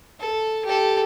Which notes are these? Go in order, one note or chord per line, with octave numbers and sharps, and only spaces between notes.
A4
G4 A4